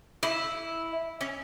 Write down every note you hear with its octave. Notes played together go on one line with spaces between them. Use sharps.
E4
C#4